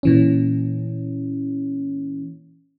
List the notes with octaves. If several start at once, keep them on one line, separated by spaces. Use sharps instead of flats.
A#2 E3 C#4